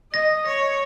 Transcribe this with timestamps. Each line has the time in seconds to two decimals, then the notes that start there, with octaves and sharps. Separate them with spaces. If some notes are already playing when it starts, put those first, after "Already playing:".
0.13 D#5 A#6
0.46 C#5 A#6